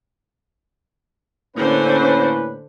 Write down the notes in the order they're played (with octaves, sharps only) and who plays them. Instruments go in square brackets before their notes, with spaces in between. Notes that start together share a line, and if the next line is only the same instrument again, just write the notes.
[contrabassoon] A2 [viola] D3 C5 [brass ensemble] A#3 C#4 B4